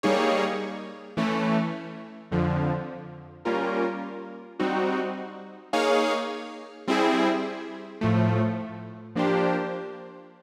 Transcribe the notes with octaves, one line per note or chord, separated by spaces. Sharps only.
G3 A#3 D#4 G#4 C#5
E3 A3 C#4
F2 D3 F3
G3 A#3 C#4 F4 A#4
G3 C4 D#4 F#4
A#3 D#4 G#4 C#5 F5
G3 C4 E4 G#4
A2 F3 A3
F3 A#3 D4 G4 C5